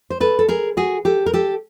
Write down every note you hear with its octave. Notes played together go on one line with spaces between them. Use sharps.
C5
A4 B4
A4
G#4 A#4
F#4 G#4
G4 A4
A#4
G4 A4